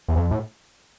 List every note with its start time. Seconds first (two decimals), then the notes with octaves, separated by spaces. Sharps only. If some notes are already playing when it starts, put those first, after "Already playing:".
0.08 E2
0.16 F2
0.31 A2